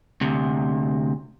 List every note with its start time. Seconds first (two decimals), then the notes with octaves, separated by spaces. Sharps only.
0.21 D2 C3